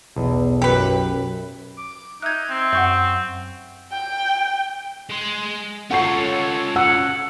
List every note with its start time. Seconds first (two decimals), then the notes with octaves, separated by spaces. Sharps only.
0.16 B1 E2
0.62 F#2 G4 B4
1.77 D6
2.22 D#4 E5 F#6 G#6
2.50 C4
2.73 F#2 F#5 C#6 G6
3.92 G5
5.09 G#3 C6
5.91 C#4 F4 A4 C#5 F#5 C#6 C7
6.76 F#5 E6